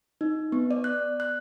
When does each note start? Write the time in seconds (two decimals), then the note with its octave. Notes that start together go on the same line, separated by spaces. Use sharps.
0.21 D#4
0.52 B3
0.71 D5
0.84 F#6
1.20 F#6